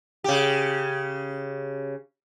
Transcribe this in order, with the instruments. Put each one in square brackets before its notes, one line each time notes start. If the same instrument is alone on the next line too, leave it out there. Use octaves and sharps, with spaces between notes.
[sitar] C#3 G4